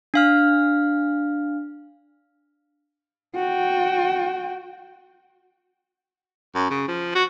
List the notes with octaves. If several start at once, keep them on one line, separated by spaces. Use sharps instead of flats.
D4 F5 F6
F#4 G5
F#2
C#3
F3
F#4